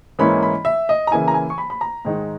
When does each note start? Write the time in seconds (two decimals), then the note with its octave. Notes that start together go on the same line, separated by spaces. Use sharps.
0.19 G#2 E3 A#3 C#4 E4 B5
0.43 B5
0.65 E5
0.89 D#5
1.07 A#5
1.11 C#3 E3 A#3 E4 G#5
1.28 A#5
1.34 G#5
1.50 C#6
1.58 B5
1.70 B5
1.81 A#5
2.05 G#2 D#3 G#3 D#4